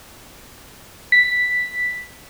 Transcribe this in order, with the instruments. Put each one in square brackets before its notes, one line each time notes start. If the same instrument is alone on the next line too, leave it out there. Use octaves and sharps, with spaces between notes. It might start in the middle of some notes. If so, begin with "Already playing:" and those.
[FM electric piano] B6